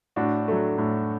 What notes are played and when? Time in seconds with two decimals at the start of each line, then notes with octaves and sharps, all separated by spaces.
0.16 A2 D4 F#4
0.48 F#3 A3
0.78 A2